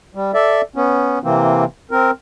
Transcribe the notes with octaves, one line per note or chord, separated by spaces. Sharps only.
G3
A4 D5 E5
B3 C#4
C3 E3 A#3 C4
C4 A#4